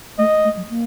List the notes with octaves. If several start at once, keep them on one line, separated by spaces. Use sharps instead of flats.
A3 D#5
A3
F#3
A#3